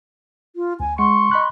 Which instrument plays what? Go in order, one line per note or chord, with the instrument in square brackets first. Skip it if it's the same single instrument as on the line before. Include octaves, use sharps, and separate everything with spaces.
[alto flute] F4
[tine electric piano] D2 [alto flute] G#5
[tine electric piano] G#3 F#5 C#7 [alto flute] C6 [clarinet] C#6
[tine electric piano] D#5 B5 F#6